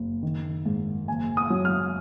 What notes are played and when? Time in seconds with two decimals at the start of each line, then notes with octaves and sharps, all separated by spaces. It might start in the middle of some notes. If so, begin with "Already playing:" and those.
Already playing: F#1
0.23 D#3
0.66 G#2
1.08 F#1 G#5
1.37 D#6
1.50 F#3
1.65 F6